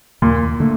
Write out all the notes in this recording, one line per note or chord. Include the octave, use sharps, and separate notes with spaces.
D#2 A#2
D3 A3